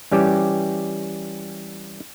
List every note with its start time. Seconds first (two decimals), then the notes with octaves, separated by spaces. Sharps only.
0.12 E3 G3 C#4 G4